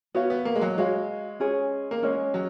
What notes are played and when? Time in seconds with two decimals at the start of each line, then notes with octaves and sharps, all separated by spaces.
0.15 B3 F#4 C#5 F5
0.30 B3
0.45 A#3
0.55 G#3
0.61 F#3
0.77 G#3 F#4 C#5 F5
1.40 C#4 G#4 C#5
1.91 A#3
2.03 G#3 C#4 G#4 C#5
2.34 F#3